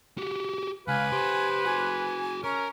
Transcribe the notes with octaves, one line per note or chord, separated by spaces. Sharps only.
F#4 G4
C#2 B4 F5 G#5
G4 C5 F#5
F#4 G#4 G#5
C#4 A#4 A#5